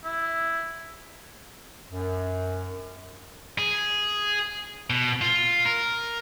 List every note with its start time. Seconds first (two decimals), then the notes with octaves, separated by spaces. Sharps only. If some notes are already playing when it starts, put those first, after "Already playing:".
0.05 E4
1.90 F#2
3.58 G#4
4.90 B2
5.22 F4
5.65 A#4